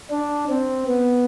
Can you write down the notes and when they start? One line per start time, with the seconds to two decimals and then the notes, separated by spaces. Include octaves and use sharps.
0.10 D4
0.49 C4
0.88 B3